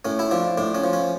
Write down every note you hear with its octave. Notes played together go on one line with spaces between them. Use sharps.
A2 C#4
E4
F3 D4
A2 D4
C#4
F3
C#4